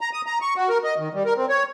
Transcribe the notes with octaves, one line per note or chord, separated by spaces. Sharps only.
A#5
D#6
A#5
C#6
F#4
A#4
D#5
D#3
G3
A#4
C4
C#5